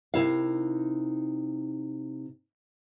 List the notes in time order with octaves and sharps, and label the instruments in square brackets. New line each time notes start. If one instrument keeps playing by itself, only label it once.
[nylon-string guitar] C3 D#4 E4 A#4 F5